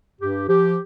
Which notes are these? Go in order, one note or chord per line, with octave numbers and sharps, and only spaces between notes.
G2 G4
F3 G4